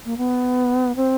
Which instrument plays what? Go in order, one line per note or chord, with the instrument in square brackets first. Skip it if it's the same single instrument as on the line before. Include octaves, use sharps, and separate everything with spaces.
[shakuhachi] A#3
B3
C4